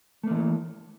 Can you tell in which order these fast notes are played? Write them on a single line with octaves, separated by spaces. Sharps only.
A3 A#3 E3